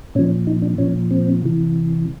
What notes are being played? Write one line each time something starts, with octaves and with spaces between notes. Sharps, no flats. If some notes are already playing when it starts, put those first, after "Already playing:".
A#2 F3 C#4
D#4
D4
A#2 F3 C#4
C4
C3 E3